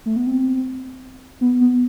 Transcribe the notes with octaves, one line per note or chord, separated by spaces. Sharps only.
A3
B3
C4
B3
B3